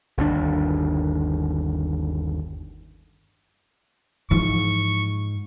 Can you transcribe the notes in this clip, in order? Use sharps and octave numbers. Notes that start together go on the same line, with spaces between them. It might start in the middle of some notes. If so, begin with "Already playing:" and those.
G1 D#2 D4
G#2 E3 F3 C#6